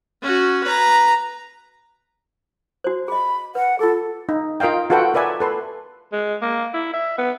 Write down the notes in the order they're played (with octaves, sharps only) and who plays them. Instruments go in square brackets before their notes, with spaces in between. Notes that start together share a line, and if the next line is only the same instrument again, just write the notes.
[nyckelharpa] C#4 F#4
B4 A#5
[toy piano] F#4 C5
[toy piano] G#4 D#5 [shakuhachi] B5
[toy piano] B4 [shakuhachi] F#5
[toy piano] F4 G#4 [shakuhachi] A4
[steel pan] D#4
F4 A#4 D#5 F5 G5
F4 F#4 A4 B4 F#5 G5
A#4 B4 D5 E5 G#5
A4 B4 C6
[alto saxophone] G#3
A#3
E4
E5
B3